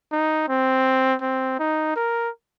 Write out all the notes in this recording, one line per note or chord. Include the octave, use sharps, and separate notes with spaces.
D#4
C4
C4
D#4
A#4